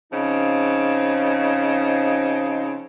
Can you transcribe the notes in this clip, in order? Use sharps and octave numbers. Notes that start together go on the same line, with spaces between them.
C#3 F3 C4 D#4